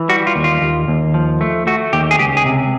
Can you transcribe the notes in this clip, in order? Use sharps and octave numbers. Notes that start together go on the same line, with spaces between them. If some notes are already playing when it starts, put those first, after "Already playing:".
Already playing: E3
G3 F#4
F4
D#2
F4
D#2
D#2
F3
A3
A3 F#4
D#2 G4
G#4
C#2 G4
G#4
C3